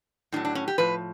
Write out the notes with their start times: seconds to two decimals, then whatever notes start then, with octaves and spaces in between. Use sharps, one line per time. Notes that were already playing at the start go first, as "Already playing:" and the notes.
0.32 A2 D4
0.36 F#3
0.45 D4
0.55 C#4
0.68 G4
0.78 A2 F3 B4